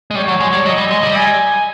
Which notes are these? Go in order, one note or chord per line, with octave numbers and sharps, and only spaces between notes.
G#3
G3 C#5
F#3
G#3
G3
F#3 D#5
G3
G#3
G3
G#5